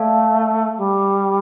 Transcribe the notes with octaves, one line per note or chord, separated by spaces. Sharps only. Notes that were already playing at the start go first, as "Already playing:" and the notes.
Already playing: A3 A4 D5 F5
G3